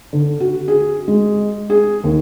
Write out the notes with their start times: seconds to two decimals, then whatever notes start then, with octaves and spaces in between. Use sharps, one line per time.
0.13 D3
0.40 F#4
0.68 G#4
1.08 G#3
1.70 G#4
2.04 D#2